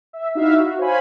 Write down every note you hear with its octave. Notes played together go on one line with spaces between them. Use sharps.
E5
D#4 E4 F#4 E5 F5
F#4
C5 C#5 F5 G#5 B5